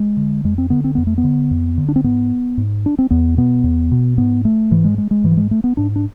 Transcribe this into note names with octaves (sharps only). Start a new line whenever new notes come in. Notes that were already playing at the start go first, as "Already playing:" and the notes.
Already playing: G#3
D3
F2 G#3
C4
D3 B3
C4
F2 B3
A3
B3
D3
F2
D3
D4
C4
G#2 B3
G#2
D4
C4
E2 B3
B2 B3
E2
B2
G#2 B3
A3
G#2 E3
G#3
G#3
G#3
G#2 E3
F3
G#3
A3
B3
G#2 D4
D4